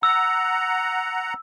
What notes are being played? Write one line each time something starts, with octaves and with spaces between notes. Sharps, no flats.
F#5 A#5 E6